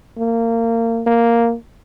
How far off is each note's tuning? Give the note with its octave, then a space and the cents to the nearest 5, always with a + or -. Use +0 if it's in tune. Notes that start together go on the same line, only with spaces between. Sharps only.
A#3 -25
A#3 +0